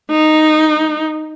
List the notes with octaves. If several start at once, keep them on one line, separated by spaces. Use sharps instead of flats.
D#4